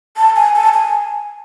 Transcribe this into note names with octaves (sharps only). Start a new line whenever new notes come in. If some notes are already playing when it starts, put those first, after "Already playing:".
A5
G#5
A5
G#5